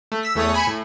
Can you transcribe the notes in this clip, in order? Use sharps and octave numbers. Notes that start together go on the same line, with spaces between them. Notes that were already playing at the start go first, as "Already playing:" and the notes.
A3
E6 B6
E2 A3 C#5 D#6
G#5 B5 C#7 E7
A2